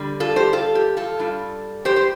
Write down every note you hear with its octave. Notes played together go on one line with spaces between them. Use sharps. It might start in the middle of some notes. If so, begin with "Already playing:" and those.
Already playing: D3 G3
F4 A4
G4 C5
F4 A4
G4
F4 A4
G2 G3 D4 F4
G4 C5
C5